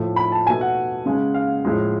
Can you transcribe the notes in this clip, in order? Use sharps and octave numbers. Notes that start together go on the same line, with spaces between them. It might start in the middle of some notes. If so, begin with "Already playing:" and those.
Already playing: A2 F3 A3
B5
A5
B2 A3 G#5
F#5
C#3 G#3
F5
A2 F3 G#3